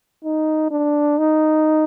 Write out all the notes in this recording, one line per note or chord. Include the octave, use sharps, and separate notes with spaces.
D#4
D4
D#4